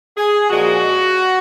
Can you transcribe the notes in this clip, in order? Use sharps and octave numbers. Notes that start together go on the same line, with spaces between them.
G#4
A#2 F3 G#3 F#4